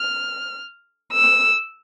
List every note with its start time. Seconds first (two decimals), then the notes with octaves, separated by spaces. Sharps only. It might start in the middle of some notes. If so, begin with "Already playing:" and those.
Already playing: F6
1.13 E6